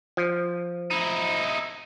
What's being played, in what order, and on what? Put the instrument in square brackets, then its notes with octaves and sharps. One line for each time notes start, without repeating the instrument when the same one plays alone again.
[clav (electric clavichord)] F3
[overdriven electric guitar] D#4 E4